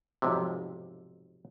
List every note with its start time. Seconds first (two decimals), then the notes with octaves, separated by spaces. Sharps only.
0.22 B1 F2 G#2 C3